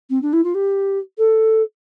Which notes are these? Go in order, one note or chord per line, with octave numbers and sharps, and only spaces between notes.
C4
D4
E4
F4
G4
A4